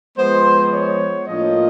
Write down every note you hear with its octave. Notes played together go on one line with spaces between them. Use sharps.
F3 G#3 B3 C5
C#5
A2 F3 A#3 D4 F4 D#5